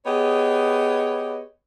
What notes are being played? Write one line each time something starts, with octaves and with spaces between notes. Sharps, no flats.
B3 G4 G#4 C#5 D#5